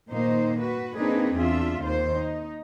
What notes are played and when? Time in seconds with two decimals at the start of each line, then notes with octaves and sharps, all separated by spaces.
0.11 A#2 D#3 A#3 D#4 C5
0.61 F#4 B4
0.96 A#3 C4 D4 D#4 G#4 B4
1.37 E2 D4 F4 E5
1.81 D#2 D#3 C5
2.13 D#4